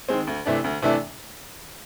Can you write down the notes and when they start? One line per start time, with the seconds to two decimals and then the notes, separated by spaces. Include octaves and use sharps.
0.08 D#3 G#3 C4
0.27 D2
0.46 C3 E3 A3 D4
0.64 D2
0.82 C3 E3 A3 D4